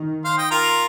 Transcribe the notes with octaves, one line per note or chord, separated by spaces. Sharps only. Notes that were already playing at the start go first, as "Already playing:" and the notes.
Already playing: D#3
C5 F5
D#5 G5
F4 A#4